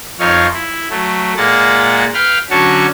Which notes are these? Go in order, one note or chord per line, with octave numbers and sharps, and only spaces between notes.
F2 F3 D#4 C#5 F5
E4
F#3 A3
A#2 G#3 A#3 F#5 A6
B4 F5 G5 F6
D3 F#3 C#4 F#4 A5 C#6